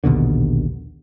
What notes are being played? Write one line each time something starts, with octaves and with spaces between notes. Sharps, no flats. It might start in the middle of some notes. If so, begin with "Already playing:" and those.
A#1 D#2 B2 D3